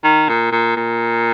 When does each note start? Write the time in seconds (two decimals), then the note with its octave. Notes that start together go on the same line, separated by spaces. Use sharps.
0.04 D#3
0.29 A#2
0.52 A#2
0.77 A#2